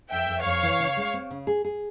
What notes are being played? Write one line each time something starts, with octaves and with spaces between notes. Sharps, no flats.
F2 E5 G5
F2
F2 C#5 F5
E3
C#3
G#3
C4
C#3
G#4
G#4